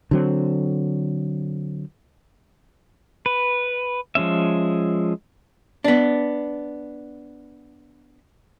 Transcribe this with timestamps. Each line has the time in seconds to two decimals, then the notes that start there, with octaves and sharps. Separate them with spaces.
0.11 D3 F#3 C4
3.26 B4
4.15 F3 G#3 C#4 E5
5.84 B3 D4